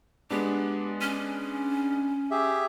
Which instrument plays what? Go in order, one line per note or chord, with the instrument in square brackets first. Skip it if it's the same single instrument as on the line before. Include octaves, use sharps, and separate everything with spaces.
[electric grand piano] G#3 B3 D4 [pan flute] G4
[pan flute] C#4
[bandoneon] G4 G#4 E5